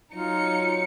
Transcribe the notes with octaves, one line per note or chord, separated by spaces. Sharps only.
F#3 D#4 F4 C#7